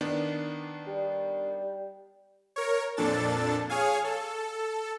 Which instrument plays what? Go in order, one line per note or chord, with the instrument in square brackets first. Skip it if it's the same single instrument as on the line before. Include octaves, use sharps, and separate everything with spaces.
[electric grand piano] D#3 B3 D4
[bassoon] G3
[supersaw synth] A#4 C#5
F2 A#2 D4 A4 A6
G#4 C#5 F5 G#5
A4